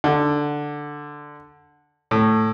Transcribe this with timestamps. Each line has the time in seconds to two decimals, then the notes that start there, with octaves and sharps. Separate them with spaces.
0.04 D3
2.11 A2